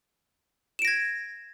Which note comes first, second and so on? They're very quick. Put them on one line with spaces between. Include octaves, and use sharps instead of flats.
E7 D7 A#6 G#6